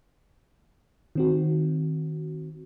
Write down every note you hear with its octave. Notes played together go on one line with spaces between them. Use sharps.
D#3 C4 F#4